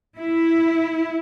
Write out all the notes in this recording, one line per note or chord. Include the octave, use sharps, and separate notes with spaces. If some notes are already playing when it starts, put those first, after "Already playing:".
E4